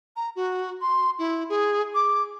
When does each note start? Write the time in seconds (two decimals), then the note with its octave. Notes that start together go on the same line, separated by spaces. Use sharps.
0.16 A#5
0.36 F#4
0.81 C6
1.19 E4
1.50 G#4
1.95 D6